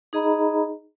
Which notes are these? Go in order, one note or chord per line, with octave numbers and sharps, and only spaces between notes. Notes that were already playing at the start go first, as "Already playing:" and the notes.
D#4 G#4 D#5 A#5 B5